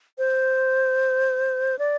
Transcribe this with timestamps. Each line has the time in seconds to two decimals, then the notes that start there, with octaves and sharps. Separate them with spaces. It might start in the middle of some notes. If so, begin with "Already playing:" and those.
0.18 C5
1.79 D5